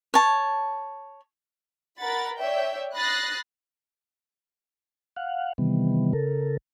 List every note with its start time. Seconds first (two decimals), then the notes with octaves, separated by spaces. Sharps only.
0.14 C#5 A5
2.00 A#4 F#5 B5 A6
2.40 C#5 D5 E5 G5
2.94 B5 D#6 F#6 A6 A#6 C7
5.16 F5 F#5
5.58 C3 D#3 E3 G3 B3
6.13 C#3 A4 A#4